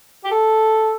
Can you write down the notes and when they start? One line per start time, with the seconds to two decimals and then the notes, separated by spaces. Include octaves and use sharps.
0.24 G4
0.31 A4